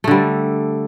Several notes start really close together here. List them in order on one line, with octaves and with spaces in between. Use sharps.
A3 D3 G3